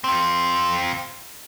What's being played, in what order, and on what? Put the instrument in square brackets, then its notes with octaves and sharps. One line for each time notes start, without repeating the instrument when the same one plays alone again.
[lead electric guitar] C4 F4